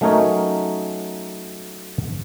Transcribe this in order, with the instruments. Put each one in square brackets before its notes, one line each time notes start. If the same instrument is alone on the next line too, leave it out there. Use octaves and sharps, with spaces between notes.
[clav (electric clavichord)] F#3 A3 C#4 D#4 A#4 C#5